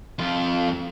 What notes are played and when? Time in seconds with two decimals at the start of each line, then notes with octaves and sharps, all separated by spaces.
0.19 F2 F4